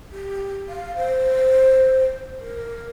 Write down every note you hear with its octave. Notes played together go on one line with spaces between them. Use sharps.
G4
F5
C5
A#4